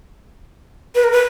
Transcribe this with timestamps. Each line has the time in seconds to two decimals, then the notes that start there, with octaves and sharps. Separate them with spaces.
0.95 B4
1.04 A#4
1.12 B4